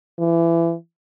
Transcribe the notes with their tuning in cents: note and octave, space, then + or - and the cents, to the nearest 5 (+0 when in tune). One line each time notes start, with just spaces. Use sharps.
E3 +25